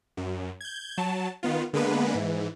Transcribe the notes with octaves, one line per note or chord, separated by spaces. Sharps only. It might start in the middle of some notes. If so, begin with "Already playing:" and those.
F#2
G6 G#6
F#3 A5
D#3 B3 F4
D3 G#3 A#3 B3 B4
G#2 E3